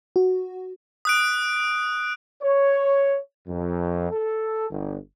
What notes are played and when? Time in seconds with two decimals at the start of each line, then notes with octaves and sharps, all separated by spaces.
0.16 F#4
1.05 D#6 F#6 D7
2.42 C#5
3.48 F2
4.11 A4
4.70 G1